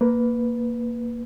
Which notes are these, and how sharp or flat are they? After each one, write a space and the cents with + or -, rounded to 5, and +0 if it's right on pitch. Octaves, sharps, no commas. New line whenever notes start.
A#3 +0 B4 +0